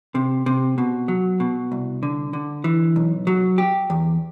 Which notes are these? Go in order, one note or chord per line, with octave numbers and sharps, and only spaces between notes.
C3
C3
B2
F#3
B2
C2
D3
D3
E3
B1
F#3
G4
E2